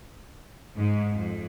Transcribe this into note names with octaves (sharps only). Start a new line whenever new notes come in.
G#2
F2